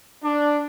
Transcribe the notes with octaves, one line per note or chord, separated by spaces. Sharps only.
D4